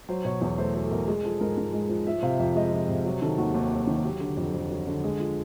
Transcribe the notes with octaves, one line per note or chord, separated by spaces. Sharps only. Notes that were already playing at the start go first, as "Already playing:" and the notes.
F#3 C5
B2 C#5
E2 C#5
A3 C5
F#3 C5
A4
B2 A#4
G#3 G#4
F3 A4
G#2 A#4
G#2
G#3
F3
F3 E5
C3 F5
F2 E5
G#3 D#5
F3
C3
F#3
D#3 A4
D#2 F#4
D#2
F#3
D#3
F#3 G4
D3
F2
F2
F#3
D3
G#3 G#4
F3